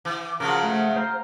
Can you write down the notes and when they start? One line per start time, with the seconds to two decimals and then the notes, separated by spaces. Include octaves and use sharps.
0.05 E3
0.40 C#3 F3 F#3 A#4
0.63 A3
0.96 C5 F5 A#5